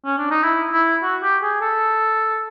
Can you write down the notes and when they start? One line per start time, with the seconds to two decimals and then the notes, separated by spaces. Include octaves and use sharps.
0.05 C#4
0.18 D4
0.31 D#4
0.43 E4
0.73 E4
1.03 F#4
1.23 G4
1.42 G#4
1.61 A4